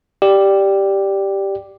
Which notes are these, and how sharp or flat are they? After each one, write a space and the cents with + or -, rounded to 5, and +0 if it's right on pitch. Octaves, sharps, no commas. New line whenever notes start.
G4 +0 D5 +0